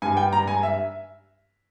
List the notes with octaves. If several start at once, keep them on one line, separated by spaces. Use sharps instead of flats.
G2 G3 G#5
G5
A#5
G#5
E5